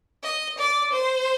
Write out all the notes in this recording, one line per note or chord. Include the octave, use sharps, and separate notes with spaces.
D#5
D5
C5